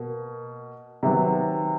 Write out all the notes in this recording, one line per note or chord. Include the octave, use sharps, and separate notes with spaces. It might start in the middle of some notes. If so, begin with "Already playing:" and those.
Already playing: B2 A#3
C3 D#3 F#3 B3